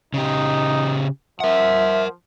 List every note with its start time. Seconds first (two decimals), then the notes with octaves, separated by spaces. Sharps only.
0.14 C#3 D#4 G4
1.40 F3 A#4 E5 F#5